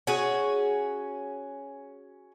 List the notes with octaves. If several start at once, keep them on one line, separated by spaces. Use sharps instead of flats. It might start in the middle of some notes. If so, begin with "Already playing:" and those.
C#4 F#4 G#4